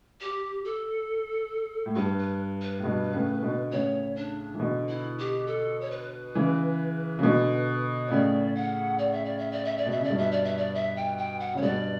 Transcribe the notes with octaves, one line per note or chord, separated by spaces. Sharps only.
G4
A4
A2
G2 B4
B4
B4
A2
G2 B2
A2 C#3
B2 D3
A2 C#3 C#5
D4
E3
B2 D3
E4
G4
A4
C#5
B4
C#3 E3
C#3
B2 D3
C#5
A2 C#3 D5
F#5
D5
E5
D5
E5
D5
E5
D5
B2
E5
C#3
D5
G2 B2
E5
D5
E5
D5
E5
G5
G5
F#5
C#3 C#5
G2 B2 D5